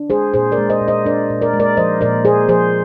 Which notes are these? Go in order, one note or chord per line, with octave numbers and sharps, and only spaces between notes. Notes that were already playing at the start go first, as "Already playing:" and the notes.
Already playing: D4
G#3 G#4 C5
A#2 G#4 C5
A#4 D5
G#3
C5 D#5
A#2
C5 D#5
D4 A#4 D5
A#2
A#4 D5
G#3
A#4 D5
F3 C5 D#5
A#2 A#4 D5
A#2 G#4 C5
F3 G#4 C5